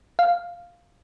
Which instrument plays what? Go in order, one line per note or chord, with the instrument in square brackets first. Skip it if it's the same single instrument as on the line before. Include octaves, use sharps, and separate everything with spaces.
[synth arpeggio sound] F5